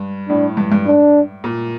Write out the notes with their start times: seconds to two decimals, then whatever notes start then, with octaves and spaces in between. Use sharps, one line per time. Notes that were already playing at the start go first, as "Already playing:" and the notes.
Already playing: G2
0.29 A2 D4
0.57 G2
0.72 G2
0.86 D4
1.44 A#2